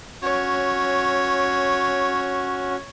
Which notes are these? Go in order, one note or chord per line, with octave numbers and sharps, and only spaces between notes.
C#4 F#4 C#5